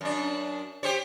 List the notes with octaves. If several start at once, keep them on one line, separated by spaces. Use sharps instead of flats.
F#2 D4
G4 C5 C#5